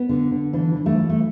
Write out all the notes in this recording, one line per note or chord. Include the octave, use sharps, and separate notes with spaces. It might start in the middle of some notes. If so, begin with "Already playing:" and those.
Already playing: B3
D3
D3
E3 D4
E3
A3
E3
A3